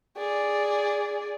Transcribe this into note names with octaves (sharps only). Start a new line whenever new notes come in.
G#4 D5